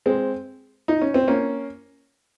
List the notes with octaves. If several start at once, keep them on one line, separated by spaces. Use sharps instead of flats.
G#3 C4
D#4
C#4
C4
A#3 C#4